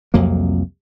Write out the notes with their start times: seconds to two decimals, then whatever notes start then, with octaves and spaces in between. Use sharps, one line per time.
0.14 C2 F2 F#3 A#3